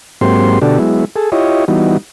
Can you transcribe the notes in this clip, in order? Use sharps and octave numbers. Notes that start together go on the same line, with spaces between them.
G#2 F#3 A#3 C4 G4 C6
B2 D3 D4 F#4 G4 A4
F#3 G#3 B3 E4
G#4 A4
E4 F4 G4 C#5 D#5
E3 G3 B3 D#4 F#4